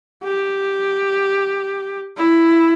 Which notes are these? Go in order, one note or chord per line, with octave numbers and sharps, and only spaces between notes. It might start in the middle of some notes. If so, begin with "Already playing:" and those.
G4
E4